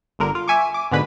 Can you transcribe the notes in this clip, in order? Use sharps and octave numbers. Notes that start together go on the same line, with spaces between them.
G1 D3 A#4
F4
E5 G#5 C#6 D6
D6
G#2 B2 D3 G#3 B4 B5